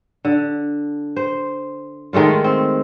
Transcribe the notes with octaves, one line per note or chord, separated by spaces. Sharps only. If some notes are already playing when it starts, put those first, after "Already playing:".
D3
C5
D#3 G#3 A3 F4
C4